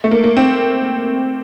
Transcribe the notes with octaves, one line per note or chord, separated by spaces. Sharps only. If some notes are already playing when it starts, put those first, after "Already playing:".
A3
A#3
A#3
C4